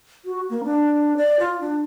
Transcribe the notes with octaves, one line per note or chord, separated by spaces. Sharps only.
F#4
A#3
D4
D5
F4
D4